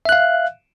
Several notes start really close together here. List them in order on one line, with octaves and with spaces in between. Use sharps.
E5 F#6 F5